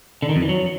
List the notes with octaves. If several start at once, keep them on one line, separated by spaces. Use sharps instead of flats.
D3
D#3
F2
E3
F#3